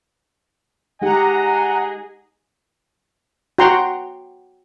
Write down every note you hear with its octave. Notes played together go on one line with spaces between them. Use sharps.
G#3 D#4 G4 G#4 D#5 F#5 G#5 A#5
F#4 F#5 G5 A#5 C6